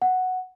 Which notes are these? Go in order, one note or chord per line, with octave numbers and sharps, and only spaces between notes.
F#5